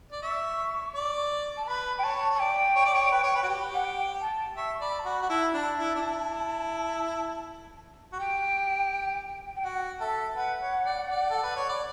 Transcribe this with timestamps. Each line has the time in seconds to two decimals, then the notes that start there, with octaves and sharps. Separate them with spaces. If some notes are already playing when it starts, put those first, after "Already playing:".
0.12 D5
0.22 E5 C#6
0.95 D5
1.57 A5
1.67 B4 B5
1.99 G5
2.03 C#5 A5
2.30 C#5
2.35 A5
2.39 D5 G5
2.75 C#5
2.85 D5
2.94 C#5
3.12 B4
3.23 C#5
3.35 B4
3.43 F#4
3.49 G4
3.74 F#5
3.85 G5
4.21 A5
4.57 E5 C#6
4.81 D5 B5
4.99 A5
5.05 F#4 B5
5.22 F#4
5.29 E4 A5
5.43 B5
5.53 D4 A5
5.78 E4
5.95 D4
6.01 E4
8.12 F#4
8.19 G4 G5
9.56 G5
9.64 F#4 F#5
10.00 A4 E5
10.36 B4 F#5
10.60 C#5
10.85 D5
11.09 D5
11.30 A4
11.43 B4
11.56 C#5
11.69 D5